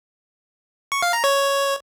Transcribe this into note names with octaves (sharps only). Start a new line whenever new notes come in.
C#6
F5
A#5
C#5